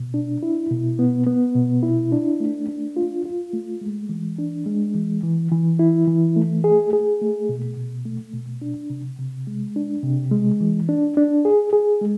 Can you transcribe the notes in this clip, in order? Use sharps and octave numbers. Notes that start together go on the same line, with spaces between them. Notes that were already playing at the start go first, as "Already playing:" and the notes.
Already playing: B2
D4
E4
B2
B3
B3
B2
E4
D4
A3
D4
F4
F4
A3
G#3
E3
D4
G#3
E3
E3
E3
E4
E3
A3
G#4
G#4
A3
B2
B2
A3
B2
D4
C3
C3
G#3
D4
C3
G#3
E3
D4
D4
G#4
G#4
G#3